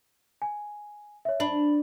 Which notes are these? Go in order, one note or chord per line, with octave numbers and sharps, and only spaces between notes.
G#5
C#5 E5
D4 B5 F#7